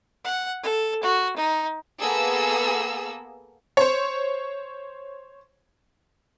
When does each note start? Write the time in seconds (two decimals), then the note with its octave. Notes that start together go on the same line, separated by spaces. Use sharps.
0.24 F#5
0.63 A4
1.03 F#4
1.37 D#4
2.00 A#3 B3 G#4 A4 E6
3.77 C5 C#5